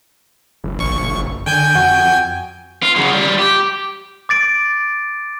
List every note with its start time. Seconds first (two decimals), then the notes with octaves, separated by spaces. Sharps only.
0.64 F#1
0.78 A#1 C#6
1.46 D3 G5 G#5 G6
1.75 F2 F#4
2.83 F4
2.96 C#3 F#3
3.11 G3 F4
3.39 G4
4.29 D6 A6 D7